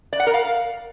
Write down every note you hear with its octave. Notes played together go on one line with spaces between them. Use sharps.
D5
F#5
A#4
F5